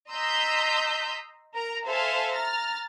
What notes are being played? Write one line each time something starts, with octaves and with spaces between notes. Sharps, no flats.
D#5 A#5 C6 E6 G6 B6
A#4 A#5
A4 C5 E5 F5 G#5 A5
A#5 F6 A6